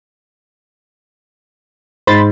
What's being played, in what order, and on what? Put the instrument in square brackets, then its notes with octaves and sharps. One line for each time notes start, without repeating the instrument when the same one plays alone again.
[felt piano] G#2 [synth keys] C5 B5 A6